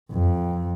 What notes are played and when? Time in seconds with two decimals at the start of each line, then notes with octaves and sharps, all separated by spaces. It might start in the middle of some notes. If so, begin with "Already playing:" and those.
0.11 F2